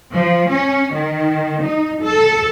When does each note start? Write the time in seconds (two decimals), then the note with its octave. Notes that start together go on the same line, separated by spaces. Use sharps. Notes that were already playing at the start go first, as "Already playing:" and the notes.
0.12 F3
0.50 C#4
0.93 D#3
1.62 D#4
2.02 A4